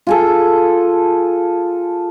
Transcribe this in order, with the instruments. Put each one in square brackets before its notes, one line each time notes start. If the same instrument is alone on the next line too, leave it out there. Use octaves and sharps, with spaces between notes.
[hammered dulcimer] F4 G#4 A4